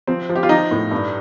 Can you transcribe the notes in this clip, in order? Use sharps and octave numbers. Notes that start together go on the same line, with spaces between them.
F3 C4
F3
G4
F4
F3 D#4
A2
G2